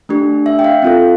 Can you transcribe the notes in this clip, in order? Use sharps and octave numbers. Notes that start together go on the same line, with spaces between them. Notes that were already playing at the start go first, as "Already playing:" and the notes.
A3 D4 G4
E5
G5
F5
C4 F4 A4